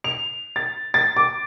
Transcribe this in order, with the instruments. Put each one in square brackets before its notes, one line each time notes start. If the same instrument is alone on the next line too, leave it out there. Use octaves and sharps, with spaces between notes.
[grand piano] F7
A6
A6
D6